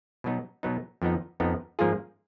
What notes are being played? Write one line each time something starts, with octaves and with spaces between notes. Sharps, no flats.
B2 F#3 B3 D#4
B2 F#3 B3 D#4
F2 F3 B3 D#4
F2 F3 B3 D#4
G#2 F3 A#3 F4 G#4